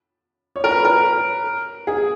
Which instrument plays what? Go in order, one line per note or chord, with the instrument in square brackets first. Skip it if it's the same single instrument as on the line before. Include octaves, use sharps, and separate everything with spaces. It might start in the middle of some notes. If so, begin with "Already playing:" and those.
[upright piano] C#5
A#4
B4
A#4
G#4